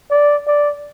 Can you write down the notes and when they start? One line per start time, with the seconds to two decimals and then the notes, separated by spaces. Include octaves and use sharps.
0.10 D5
0.47 D5